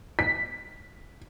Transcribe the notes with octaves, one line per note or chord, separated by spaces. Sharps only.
B6